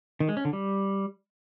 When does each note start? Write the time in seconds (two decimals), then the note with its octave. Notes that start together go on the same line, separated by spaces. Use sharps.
0.20 D#3
0.29 G#3
0.37 C#4
0.45 D3
0.53 G3